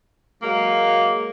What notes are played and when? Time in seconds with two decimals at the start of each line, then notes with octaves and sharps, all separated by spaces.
0.43 F#3 G#3 A#3